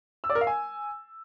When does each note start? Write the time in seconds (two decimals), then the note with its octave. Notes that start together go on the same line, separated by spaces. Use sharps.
0.24 E6
0.30 D5
0.35 A#4
0.41 F5
0.47 G#5